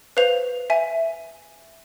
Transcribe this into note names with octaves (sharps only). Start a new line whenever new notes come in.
B4 C5 F5 F7
E5 G#5